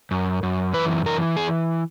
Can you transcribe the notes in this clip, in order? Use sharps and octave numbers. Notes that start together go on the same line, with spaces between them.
F#2
F#2
E3 B4
E3 A#4
G#4